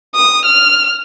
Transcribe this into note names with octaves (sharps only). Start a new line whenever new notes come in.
D#6
F6